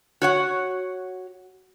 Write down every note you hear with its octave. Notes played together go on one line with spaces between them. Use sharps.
F#4 C#5 F#5